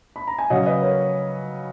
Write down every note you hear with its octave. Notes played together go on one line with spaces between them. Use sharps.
B5
A#5
G#5
C#3 F#3 C#4 D#5 F#5
B4 D#5
A#4 C#5